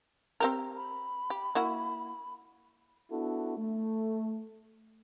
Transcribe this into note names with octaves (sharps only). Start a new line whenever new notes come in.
C4 G4 A#4
B5
G4
A#3 E4 F#4
B3 D4 E4 F#4 A4
A3